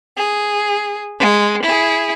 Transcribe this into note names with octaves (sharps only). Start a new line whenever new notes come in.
G#4
G#3
E4 G#4